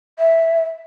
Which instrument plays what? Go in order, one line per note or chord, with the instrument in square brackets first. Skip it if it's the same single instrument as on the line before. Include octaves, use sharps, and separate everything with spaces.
[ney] E5